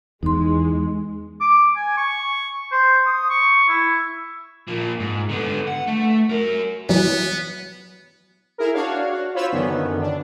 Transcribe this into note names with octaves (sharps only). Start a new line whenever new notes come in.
E2 G#3 D#4 C6
D6
G#5
C#6
C5
D#6
C#6
E4
A#2 F3
G#2
D3 B3
F#5
A3
F#4 A#4
E3 F#3 B3
E4 G#4 A#4
D4 F#4 C#5 F5
F#4
F4 C5 C#5 B5 E6
F#2 D3 D#3 B3 C#4
D4